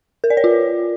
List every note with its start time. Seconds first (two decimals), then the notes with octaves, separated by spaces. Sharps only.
0.24 A#4
0.30 D5
0.37 C#5
0.44 F4